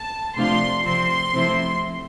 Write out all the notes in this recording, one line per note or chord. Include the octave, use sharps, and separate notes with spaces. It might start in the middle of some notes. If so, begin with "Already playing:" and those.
Already playing: A5
C3 F3 A3 D4 F4 C6
C3 F3 C4 C6
C3 F3 A3 C4 E4